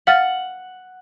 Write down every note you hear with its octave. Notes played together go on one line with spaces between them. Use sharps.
F5 F#5 F6 A6